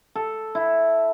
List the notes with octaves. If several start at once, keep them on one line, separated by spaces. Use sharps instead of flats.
A4
E4